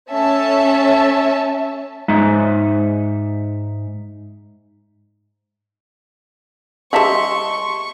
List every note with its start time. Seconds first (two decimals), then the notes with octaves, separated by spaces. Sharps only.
0.11 A3 C#4 E5 A5
2.08 G#2 G#3 D#4 E5
6.93 G3 G#4 D#5 E5 A5 C6 C#6